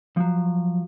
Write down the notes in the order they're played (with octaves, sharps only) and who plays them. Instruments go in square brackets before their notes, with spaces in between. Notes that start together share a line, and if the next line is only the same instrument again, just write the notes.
[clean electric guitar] F3 F#3